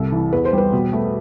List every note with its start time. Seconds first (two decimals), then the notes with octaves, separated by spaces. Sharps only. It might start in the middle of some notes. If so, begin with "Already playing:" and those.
Already playing: C2 A4
0.12 E3
0.33 E2 B4
0.45 C5
0.53 G3 B4
0.73 B2
0.93 A3